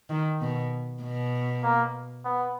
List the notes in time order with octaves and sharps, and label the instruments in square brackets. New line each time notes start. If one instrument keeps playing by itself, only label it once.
[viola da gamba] D#3
B2
B2
[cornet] A#3
B3